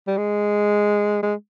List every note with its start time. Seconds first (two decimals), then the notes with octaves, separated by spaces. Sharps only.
0.07 G3
0.17 G#3
1.23 G#3